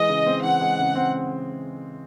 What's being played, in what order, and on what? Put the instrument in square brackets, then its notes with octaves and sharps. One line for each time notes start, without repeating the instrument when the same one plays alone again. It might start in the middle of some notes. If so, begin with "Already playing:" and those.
Already playing: [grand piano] E3 G#3 [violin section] D#5
[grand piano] C#3
C4
[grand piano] E3 [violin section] F#5
[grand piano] G#3
C#3
C4